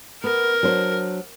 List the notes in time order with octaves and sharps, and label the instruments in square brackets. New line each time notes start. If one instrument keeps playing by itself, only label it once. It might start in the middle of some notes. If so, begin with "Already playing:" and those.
[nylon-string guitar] B3 [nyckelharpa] A#4
[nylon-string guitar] F#3 D4 C5